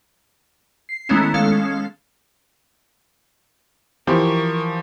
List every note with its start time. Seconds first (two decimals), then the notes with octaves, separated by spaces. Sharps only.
0.89 C7
1.09 D#3 G#3 A3 B3 C#4 E4
1.34 G#3 C#4 A4 F5
4.07 E3 F3 G4 A#4 C5 C#6